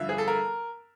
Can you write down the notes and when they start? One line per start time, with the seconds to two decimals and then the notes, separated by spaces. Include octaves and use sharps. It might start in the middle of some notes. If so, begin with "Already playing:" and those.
Already playing: G2 D3 F3 E5 F5
0.09 G#4
0.18 A4
0.28 A#4